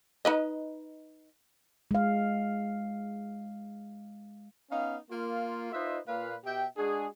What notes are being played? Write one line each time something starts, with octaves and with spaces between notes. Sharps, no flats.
D#4 B4 D#5
G#3 F5
B3 C#4 D#4 F5
A#3 F4
D#4 F4 B4 C5 D#5 E5
A#2 B4 F5
B2 G4 E5 G5
G#3 D4 F#4 G#4